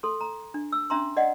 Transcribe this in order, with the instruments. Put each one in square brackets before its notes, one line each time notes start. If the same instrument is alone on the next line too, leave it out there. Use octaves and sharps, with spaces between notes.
[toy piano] A4 C6
A#5
D4
E6
C#4 D4 E5 A#5 C6
D5 D#5 F#5